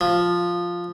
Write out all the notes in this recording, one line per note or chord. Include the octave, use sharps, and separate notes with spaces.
F3